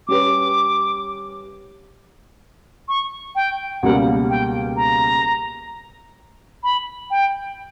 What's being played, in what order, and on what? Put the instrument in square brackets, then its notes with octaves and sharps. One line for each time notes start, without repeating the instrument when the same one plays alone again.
[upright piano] G3 C#4 G4 B4 [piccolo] D6
[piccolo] C#6
G5
[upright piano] C#2 B2 G3 A#3 [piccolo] F#5
[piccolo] G5
A#5
B5
G5